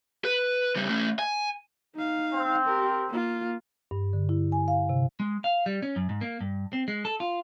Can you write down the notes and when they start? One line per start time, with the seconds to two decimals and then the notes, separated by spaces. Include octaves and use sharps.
0.25 B4
0.76 C#3 G3
0.89 A3 C#4
1.19 G#5
1.95 D#4 F5
2.35 C4
2.67 G4 A#4
3.09 A#3 F4
3.91 G2
4.13 D3
4.29 E4
4.52 G#5
4.68 F5
4.89 C3
5.20 G#3
5.44 F5
5.66 G3
5.82 C#4
5.96 F#2
6.09 G#2
6.21 A#3
6.41 G2
6.73 C4
6.88 G#3
7.05 A4
7.20 F4